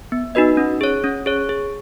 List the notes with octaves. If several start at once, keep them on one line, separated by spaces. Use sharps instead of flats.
B3
D#4 F#4 B4 D#5
C#4
G#4 C#5
C#4
G#4 C#5
G#4